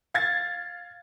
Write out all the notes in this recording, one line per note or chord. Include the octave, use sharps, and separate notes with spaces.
F5 G#6 A6